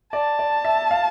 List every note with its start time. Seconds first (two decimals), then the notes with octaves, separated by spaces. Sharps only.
0.13 D5 A5
0.39 D5
0.65 E5
0.91 F5